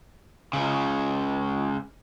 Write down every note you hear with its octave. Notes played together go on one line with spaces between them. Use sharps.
C#2 C#3